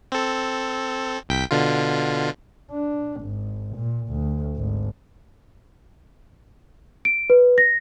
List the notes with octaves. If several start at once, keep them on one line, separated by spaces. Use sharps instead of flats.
C4 A4
C2 G5 B6
B2 D3 F4
D4
G#1
A#2
D2
G#1
D7
B4
A#6